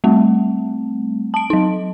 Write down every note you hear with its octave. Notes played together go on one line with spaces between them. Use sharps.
G3 A3 C4
A5 D7
F#3 D#4